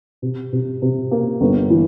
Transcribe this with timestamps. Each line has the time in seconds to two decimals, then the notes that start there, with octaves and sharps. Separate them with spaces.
0.22 C3
0.53 C3
0.82 C3
1.11 A#3
1.41 G1
1.70 E3